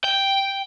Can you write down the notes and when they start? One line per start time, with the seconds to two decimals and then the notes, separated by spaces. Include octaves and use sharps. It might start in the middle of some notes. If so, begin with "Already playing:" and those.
0.04 G5